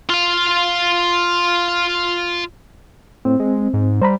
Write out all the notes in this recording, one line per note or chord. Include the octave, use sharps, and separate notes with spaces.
F4 F5
A2 C4
G#3
G#2
G3 C5 A#5 B5